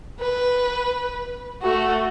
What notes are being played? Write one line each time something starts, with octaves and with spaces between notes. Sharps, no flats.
B4
A3 F#4